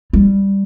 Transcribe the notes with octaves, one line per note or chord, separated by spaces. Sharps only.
G3